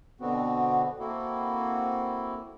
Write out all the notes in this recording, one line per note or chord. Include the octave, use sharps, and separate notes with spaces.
B2 D3 B3 C4 F#4
A#3 C4 E4 F#4 A4